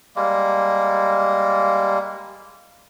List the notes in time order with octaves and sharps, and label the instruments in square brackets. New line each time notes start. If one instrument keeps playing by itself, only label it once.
[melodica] G3 G#3 A#3